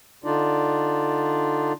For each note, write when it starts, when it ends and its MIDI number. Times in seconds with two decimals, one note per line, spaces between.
0.24 1.73 50
0.24 1.73 62
0.24 1.73 63
0.24 1.73 65
0.24 1.73 74